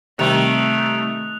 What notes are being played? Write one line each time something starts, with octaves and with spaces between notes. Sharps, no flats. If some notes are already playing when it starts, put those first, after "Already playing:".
C3 D#3 G3 A3 F#6 F7